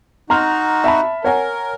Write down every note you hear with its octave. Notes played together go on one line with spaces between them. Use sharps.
D#4 F#4 A#5 C6 F6
E5 A5 B5
A#4 C#5 F#5 G#5